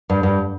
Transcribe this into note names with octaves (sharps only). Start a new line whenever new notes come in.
G2
G2